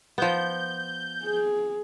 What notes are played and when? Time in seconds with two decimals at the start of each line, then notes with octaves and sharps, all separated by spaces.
0.18 F3 B3 G6
1.24 G#4